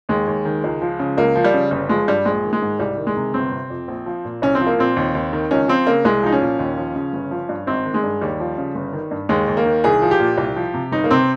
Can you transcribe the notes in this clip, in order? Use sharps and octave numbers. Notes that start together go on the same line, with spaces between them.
D#2 G#3
D#2
D#3
C#2
F3
C#3
C#2 A#3
F3
G3
C#3
G1 G3
F3 G#3
G2 G3
A#1 G#3
D#3
G#3
G#2
C2 G3
D#3
G#3
C3
G1 C4
C3
F2
A#1
F3
A#2
C2 C#4
C4
F3
A#3
A#2 C4
D#2
D#2
D#3
C#2 C#4
F3 C4
C#3 A#3
C2 G#3
F3 D#4
C#4
A#2
D#2
F3
C#3
G1
F3
G2
G#1 C4
D#3
G#3
G2
D#2 G3
F3
C#3
G1
D#3
G2
D#2 G#3
D#2
A#3
D#3
C2 G#4
F3
G4
A#2
C2
F3
C3
G1 D#4
A#3
C3 C4